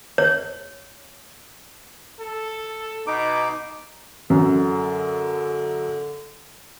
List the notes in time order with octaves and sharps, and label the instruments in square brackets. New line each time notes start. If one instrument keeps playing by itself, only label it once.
[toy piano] C#5
[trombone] A4
[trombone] B2 [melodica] D#4 D6
[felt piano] F#2 [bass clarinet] D3